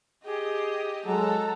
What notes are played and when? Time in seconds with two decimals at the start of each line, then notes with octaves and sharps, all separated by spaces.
0.25 G4 G#4 D#5
1.06 F#3 G#3 A4 F#5 A#5